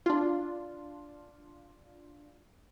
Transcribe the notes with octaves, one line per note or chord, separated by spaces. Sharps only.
D4 F4